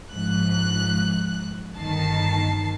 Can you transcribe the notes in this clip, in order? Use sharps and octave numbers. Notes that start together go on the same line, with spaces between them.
G#2 F3 F#6
G1 D#3 A5 C7